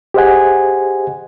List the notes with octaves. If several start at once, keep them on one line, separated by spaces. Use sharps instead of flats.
G4 G#4 C5 D#5 F#5 G#5